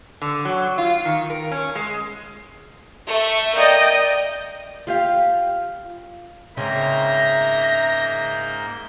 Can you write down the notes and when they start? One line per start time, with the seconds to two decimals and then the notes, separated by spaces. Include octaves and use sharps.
0.22 D3
0.45 F#3
0.78 F4
1.05 D#3
1.30 A#4
1.51 C#4
1.75 G#3
3.07 A3 E5
3.55 A#3 D5 D#5 G5
4.87 F4 G4 F5
6.57 G#2 C#3 A#3 C4 E5 A#5 G6